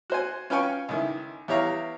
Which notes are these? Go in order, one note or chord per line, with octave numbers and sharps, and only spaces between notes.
F#4 C5 G#5
C#4 F4 B4 G5 G#5 C#6
C#2 D#3 E4
E2 E4 G4 C#5 F5 A#5